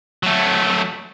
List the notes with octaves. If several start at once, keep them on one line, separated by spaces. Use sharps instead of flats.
F#3 A3